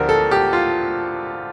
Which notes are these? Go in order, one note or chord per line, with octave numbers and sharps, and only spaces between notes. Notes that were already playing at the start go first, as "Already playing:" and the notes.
Already playing: D2 D3 F3 G4 A#4
A4
G4
F4